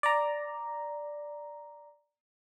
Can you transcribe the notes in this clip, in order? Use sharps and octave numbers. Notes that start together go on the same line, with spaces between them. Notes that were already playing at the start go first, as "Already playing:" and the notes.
D5 A#5